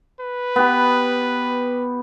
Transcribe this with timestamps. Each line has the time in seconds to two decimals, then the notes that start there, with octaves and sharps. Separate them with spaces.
0.20 B4
0.56 B3 G4